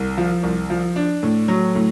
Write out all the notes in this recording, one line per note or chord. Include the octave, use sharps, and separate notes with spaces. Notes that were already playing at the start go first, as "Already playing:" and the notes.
Already playing: C2
F3
C2
F3
D4
A2
F#3
A2